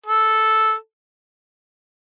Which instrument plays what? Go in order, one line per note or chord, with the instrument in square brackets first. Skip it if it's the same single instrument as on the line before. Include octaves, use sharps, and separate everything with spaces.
[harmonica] A4